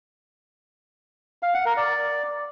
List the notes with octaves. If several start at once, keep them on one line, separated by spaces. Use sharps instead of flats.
F5
F#5
A#4
D5